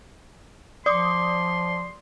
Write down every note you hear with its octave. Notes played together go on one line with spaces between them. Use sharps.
F3 D5 C6 D6 D#6